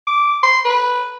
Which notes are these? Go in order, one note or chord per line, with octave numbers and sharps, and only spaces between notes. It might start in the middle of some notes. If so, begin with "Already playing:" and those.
D6
C6
B4